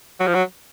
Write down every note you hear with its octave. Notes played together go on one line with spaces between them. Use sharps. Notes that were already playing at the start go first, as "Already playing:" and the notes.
F#3
F3
F#3